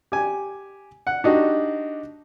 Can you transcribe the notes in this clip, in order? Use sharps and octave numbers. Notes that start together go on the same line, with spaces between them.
G4 G#5
F#5
D4 D#4 F#4 G4